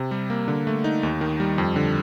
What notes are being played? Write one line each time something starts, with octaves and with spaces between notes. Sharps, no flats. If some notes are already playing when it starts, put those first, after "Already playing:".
Already playing: C3
G3
A#3
D3
A3
D#4
D#2
D#3
G3
F2
D3